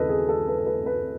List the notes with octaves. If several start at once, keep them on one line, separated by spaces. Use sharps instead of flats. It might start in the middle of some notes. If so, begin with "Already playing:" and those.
Already playing: D#2 C#3 E3 A4 B4 D#5
G#4
A4
B4
A4
B4
B4